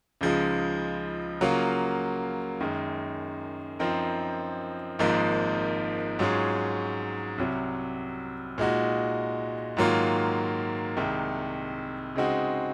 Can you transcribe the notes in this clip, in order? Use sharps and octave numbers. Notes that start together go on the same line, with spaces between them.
C#2 C#3 F3 G#3 D#4
C#3 F#3 A#3 F4
F#2 D#3 G#3
F#2 F3 C4 D#4 A#4
G#1 G#2 F3 A#3 D#4
G#2 F#3 C#4 F4 G#4
C2 C3 F#3
A#2 G#3 D#4 F#4
G#2 D#3 F#3 A#3 F4
C2 C3 D#3 G#3
C#3 G#3 C4 D#4 F#4